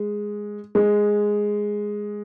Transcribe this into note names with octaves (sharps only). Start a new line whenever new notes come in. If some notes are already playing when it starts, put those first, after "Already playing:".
Already playing: G#3
G#3